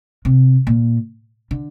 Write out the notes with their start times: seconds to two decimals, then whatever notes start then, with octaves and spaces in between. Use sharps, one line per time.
0.25 C3
0.67 A#2
1.51 D3